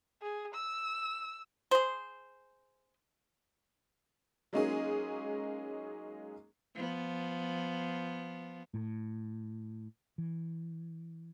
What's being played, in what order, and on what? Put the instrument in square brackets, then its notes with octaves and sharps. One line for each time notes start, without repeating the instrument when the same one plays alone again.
[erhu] G#4
E6
[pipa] G#4 C5
[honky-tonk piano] F#3 G#3 A#3 C#4 D#4 G#4
[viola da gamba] F3 B3
[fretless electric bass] A2
E3